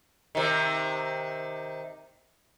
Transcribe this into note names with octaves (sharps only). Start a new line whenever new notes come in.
C3 D#3